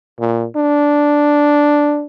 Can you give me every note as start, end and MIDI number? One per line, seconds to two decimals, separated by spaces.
0.20 0.47 46
0.56 2.07 62